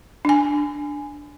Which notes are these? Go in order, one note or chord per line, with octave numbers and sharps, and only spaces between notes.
D4 G#5